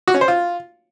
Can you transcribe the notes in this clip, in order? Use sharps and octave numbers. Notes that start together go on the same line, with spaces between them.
F#4
C#4
C5
F4